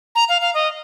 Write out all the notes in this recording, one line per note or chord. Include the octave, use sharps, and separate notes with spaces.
A#5
F5
F5
D#5